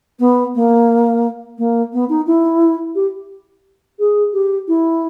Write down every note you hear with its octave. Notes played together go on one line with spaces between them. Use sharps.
B3
A#3
A#3
B3
D#4
E4
G4
G#4
G4
E4